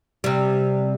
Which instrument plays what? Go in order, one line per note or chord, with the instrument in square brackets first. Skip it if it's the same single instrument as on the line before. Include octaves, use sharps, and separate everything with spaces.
[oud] C3 G3